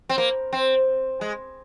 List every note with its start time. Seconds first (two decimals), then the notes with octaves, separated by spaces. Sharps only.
0.09 C4
0.18 A#3
0.53 C4
1.21 G#3